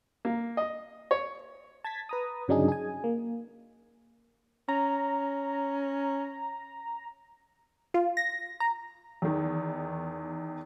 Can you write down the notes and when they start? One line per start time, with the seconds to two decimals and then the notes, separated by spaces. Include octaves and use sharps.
0.25 A#3
0.57 D#5
1.11 C#5
1.84 A5 G#6 A6 B6
2.09 B4 A#5 D#6
2.48 G1 C#3 F#3 D4 D#4 G#4
2.68 G#4 G#5
3.04 A#3
4.69 C#4 A#5
7.94 F4
8.17 A#6
8.60 A#5
9.22 E2 D#3